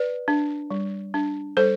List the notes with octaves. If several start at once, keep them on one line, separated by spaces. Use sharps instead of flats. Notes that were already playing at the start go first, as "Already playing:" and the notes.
Already playing: B4 D5
D4
G3
D4
G3 A4 C5